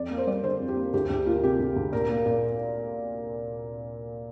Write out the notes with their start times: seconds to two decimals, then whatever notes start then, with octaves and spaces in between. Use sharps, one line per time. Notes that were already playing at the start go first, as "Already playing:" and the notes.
Already playing: F2 D5
0.11 A#3
0.18 C5
0.27 G3 D5
0.44 D3 C5
0.60 F2
0.68 G4
0.77 A#3
0.93 D2 G4
1.10 D2 G4
1.26 A#3 F4
1.43 C3 G4
1.59 D2
1.76 D2
1.92 A#2 A#4
2.09 A#3
2.26 A#2